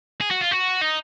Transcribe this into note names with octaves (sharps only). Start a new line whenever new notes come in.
G#4
F#4
F4
F#4
D#4